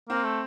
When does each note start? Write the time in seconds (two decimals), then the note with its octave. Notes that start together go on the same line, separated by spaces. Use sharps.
0.09 A#3 C4
0.24 A3